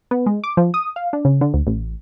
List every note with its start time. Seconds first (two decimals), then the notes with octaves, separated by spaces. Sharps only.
0.11 B3
0.26 G#3
0.44 D6
0.57 F3
0.74 D#6
0.96 F5
1.13 D4
1.25 C#3
1.41 D3
1.54 D2
1.67 A1